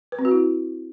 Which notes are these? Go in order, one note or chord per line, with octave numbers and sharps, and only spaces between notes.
B4
C4
F#4
E4